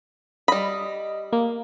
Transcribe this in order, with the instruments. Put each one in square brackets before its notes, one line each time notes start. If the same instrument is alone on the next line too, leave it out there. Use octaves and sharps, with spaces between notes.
[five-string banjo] G3 B5 [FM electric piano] D#5
[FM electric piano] A#3